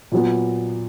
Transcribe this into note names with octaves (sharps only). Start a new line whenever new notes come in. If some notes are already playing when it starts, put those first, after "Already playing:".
A#2 F#3 B3